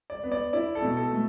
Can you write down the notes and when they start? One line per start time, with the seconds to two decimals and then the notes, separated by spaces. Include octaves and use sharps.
0.10 D5
0.23 B3
0.32 D5
0.53 E4 D5
0.75 A4
0.82 B2
0.97 A4
1.11 A3